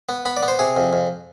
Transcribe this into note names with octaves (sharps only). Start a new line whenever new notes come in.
B3
B3 B5
D5
B3
C5
C3 G#4
F2
F2